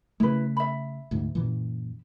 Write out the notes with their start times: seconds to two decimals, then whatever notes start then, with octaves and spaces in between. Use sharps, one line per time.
0.20 C#3 A3 E4 B4
0.57 E5 B5
1.11 D2 G#2
1.35 F#2 A#2 E3